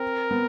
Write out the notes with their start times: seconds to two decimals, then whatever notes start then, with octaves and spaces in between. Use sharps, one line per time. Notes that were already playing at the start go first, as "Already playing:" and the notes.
Already playing: C4 A#4
0.31 B3